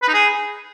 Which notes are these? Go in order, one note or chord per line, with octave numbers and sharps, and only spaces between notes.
B4
D#4
G#4